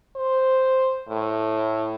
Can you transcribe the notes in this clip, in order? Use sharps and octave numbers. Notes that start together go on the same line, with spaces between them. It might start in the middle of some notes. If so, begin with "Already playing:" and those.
C5
A2